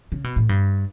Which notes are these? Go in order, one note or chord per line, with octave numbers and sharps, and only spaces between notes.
C#3
B2
A2
G2